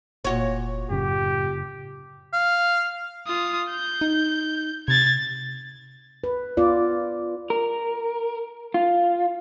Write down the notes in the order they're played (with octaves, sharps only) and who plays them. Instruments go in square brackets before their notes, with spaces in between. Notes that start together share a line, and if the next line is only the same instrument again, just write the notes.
[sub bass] F1 [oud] A#2 F#4 C#5
[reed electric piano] F#2 C#3 [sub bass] A2 [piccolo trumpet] G4
[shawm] F5
[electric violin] F4 D#6
G6
[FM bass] D#4
[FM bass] C3 [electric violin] G#6 A6
[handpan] B4
B3 F4 D5
[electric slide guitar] A#4
F4